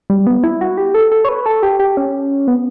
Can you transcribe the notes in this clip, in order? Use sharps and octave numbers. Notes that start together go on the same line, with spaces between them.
G3
B3
E4
F#4
G4
A4
A4
C#5
B4
A4
G4
G4
C#4
B3